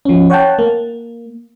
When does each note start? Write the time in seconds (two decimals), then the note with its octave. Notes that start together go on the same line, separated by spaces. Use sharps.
0.05 F3 C#4
0.30 C#5 F#5 G5 A5
0.59 A#3